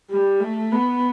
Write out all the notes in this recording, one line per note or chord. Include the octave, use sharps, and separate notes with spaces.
G3
A3
B3